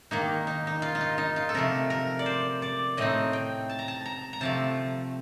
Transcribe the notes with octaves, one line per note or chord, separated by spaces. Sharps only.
D#3 A#3 D#4
D#4
D#4
F4
D#4
F4
D#4
F4
A4
C3 F3 A3 A#4
A#4
D5
C5
D5
A2 A3 C4 D#4 D#5
G5
A5
A#5
A5
A#5
A#5
C3 F3 A3 A5